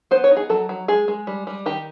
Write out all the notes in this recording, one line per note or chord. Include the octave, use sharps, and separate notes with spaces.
B3 C5
C#5
D#4
G#4
F#3 A4
F#3
G#3 G#4
G#3
G3
G3
D#3 G4